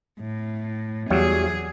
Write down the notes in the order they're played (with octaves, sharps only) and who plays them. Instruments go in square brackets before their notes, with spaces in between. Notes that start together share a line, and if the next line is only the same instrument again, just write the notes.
[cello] A2
[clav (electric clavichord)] E2 F#3 G3 [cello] G#4